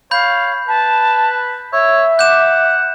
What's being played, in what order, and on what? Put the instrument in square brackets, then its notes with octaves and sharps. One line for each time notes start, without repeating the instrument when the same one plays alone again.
[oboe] C#5 [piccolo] F5 [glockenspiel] B5 G6
[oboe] B4 [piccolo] A5
[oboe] C#5 [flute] E5 [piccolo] E6
[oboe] F#5 [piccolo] D6 [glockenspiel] G6 E7